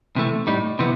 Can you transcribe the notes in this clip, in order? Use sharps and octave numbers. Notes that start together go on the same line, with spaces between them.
C3 E3 A3
A2 G3 D#4
C3 E3 B3